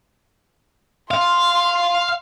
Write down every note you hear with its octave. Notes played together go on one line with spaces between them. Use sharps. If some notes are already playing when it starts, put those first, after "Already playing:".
F5 C6